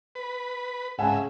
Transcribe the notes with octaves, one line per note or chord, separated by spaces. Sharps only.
B4
G#2 C#3 E5 F#5 G#5 A5